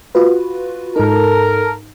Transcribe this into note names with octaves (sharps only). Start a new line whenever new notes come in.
F4 F#4 B4
G#2 D#4 A4 A#4